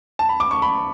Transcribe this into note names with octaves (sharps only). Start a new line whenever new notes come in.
A5
B5
D6
C#6
B5